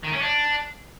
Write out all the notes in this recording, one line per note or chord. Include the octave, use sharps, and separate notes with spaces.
D#3
C#4
D4